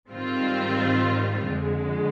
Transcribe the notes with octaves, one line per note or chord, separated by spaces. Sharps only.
G#2 D#3 G3 C4 F4
F2 D3 G#3